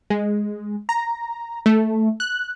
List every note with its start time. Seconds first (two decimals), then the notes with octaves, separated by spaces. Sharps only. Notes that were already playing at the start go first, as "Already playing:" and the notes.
0.10 G#3
0.89 A#5
1.66 A3
2.20 F#6